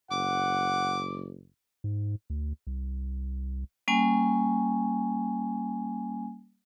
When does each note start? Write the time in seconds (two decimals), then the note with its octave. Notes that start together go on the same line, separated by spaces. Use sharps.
0.11 F#1 F#5 D6
1.84 G#2
2.30 D2
2.67 C2
3.88 G3 A#3 C#4 G#5